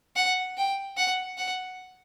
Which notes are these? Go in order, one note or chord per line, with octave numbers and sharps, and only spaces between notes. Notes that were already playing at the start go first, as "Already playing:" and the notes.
F#5
G5
F#5
F#5